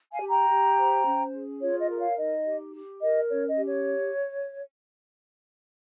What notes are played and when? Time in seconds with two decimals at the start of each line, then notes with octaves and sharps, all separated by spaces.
0.12 F5 G#5
0.21 G4
0.30 G5 A#5
0.49 G4
0.77 C5
1.06 C#4
1.33 G#4
1.61 F4 C#5
1.80 D#5
1.90 A#4
1.98 C#5 F5
2.18 D#4 D#5
2.45 G4
2.74 G4
3.01 A#4 D#5
3.29 C#4 C#5
3.48 D#5
3.57 G4
3.68 C#5